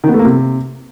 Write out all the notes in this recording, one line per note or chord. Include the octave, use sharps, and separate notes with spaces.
D#3
B3
A3
A#3
C3